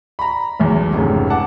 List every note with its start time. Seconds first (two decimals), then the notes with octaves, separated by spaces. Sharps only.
0.19 A#5 B5
0.60 B1 E2
0.93 F1 G#2 C#3
1.30 F#5 A5 D6